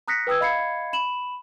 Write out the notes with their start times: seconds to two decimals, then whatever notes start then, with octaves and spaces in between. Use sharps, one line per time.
0.08 A#5 D#6 F#6 A#6 B6 C#7
0.27 B4 G5 D#6 E6 G#6
0.40 D#5 F5 B5 G#6 C7 C#7
0.93 B5 E7 F#7